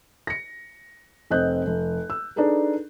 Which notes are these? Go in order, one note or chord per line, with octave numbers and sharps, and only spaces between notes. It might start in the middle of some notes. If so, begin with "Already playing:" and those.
A#6 C#7
F1 C4 D#5 F#6 G6
F1
E6
D4 D#4 G#4 A4 B4